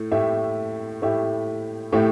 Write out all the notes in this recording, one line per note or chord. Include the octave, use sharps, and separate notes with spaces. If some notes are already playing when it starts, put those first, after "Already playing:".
Already playing: A2 A3
A2 A3 E4 G4 E5
A2 A3 E4 G4 E5
A2 A3 E4 G4 E5